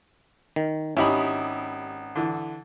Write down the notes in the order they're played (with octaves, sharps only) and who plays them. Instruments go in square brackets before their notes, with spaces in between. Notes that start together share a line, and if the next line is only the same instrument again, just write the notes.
[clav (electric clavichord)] D#3
[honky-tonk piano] G#1 D#6 [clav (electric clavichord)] C#4 D#4 [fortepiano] E4 G4 B5
[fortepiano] D3 E3